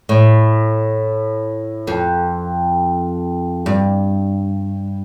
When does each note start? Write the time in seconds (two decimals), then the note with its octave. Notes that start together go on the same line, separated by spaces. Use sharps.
0.09 A2
1.87 F2
3.66 G2